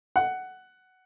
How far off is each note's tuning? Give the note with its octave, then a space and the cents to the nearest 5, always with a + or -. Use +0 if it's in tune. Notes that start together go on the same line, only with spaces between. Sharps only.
F#5 +10